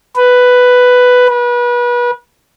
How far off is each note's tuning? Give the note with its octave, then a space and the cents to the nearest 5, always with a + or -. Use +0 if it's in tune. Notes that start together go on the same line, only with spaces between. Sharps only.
B4 +5
B4 -30